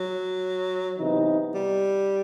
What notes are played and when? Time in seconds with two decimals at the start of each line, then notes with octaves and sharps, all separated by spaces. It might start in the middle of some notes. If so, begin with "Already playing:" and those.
Already playing: F#3
0.98 C3 E3 B3 D#4
1.55 G3